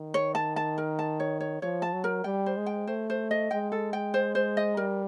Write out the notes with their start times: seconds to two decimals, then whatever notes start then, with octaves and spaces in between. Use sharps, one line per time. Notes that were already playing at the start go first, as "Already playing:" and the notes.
Already playing: D#3
0.14 C#5
0.35 A5
0.56 A5
0.78 A#4
0.99 A5
1.20 C#5
1.40 C#5
1.62 F3 C#5
1.82 A5
1.93 F#3
2.04 A#4
2.24 G3 G5
2.46 C5
2.57 G#3
2.66 G5
2.87 A3 C5
3.10 C5
3.31 D#5
3.51 G#3 G5
3.72 A4
3.93 G5
4.14 C5
4.35 C5
4.57 D#5
4.77 G3 A#4